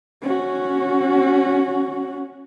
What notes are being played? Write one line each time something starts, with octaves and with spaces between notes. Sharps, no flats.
C#4 F#4